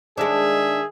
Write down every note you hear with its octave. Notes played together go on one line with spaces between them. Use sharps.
D#3 G#3 D4 G#4 E5